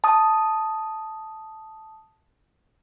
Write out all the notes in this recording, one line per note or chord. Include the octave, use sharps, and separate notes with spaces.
A5 D#6